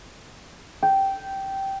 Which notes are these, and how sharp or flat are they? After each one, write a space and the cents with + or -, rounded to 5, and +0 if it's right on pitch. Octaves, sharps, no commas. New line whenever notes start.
G5 -10